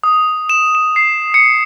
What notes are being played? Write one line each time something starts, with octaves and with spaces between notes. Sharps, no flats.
D#6
E7
E7
C7
C#7